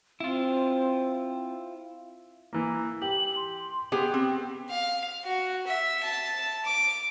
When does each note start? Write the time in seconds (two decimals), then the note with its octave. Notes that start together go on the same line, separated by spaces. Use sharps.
0.20 C4 E4 F4
2.53 E3 A#3
3.02 G4 F#7
3.36 C6
3.92 B3 G4 G#4 G5
4.14 C4
4.70 F5
5.24 F#4
5.67 E5
6.03 A5
6.65 D6